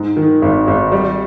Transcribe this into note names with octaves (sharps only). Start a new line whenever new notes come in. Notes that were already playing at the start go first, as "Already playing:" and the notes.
Already playing: G#2
D#3
G#1
G#1
G3